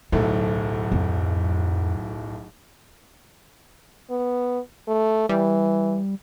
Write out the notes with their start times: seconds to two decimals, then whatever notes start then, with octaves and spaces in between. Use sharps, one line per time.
0.12 D1 B1 A3 E4
0.92 F2
4.10 B3
4.88 A3
5.29 E3 G3